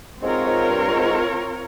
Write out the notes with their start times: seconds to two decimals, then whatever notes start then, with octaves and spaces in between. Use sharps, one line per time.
0.22 G#2 C4 F4 A#4 C#5
0.46 G#2
0.69 G2
0.93 G#2